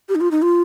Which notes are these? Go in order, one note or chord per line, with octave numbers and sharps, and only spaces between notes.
G4
D#4
F4
D#4
F4